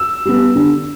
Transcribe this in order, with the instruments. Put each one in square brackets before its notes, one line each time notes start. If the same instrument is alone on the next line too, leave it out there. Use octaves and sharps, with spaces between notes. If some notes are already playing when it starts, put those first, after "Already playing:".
Already playing: [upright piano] E6
G3 B3
D3